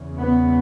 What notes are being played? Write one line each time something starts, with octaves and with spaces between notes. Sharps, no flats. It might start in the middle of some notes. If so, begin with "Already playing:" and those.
Already playing: E2 C#3
B3